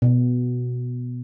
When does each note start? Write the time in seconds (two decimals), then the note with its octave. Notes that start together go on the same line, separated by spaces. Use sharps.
0.02 B2